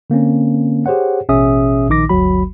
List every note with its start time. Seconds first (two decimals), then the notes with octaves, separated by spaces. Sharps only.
0.10 D3 A#3 C4 C#4
0.86 G4 G#4 C5 C#5 F#5
1.29 A1 B2 C#4 G#4 E5 D#6
1.89 A#1 D#3 D#4 D6 A#6
2.09 G1 D2 F#3 F#4 B5